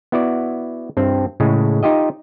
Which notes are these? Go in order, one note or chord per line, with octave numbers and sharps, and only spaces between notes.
B3 E4 F#4 D5
G2 C4
A2 C#3 G#3
D#4 F4 G4 D#5